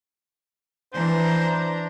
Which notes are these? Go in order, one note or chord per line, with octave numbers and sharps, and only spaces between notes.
E3 D4 C5 A#5